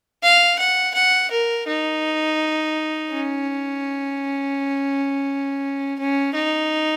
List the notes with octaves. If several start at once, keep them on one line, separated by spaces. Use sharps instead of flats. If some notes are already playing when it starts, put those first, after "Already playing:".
F5
F#5
F#5
A#4
D#4
C#4
C#4
D#4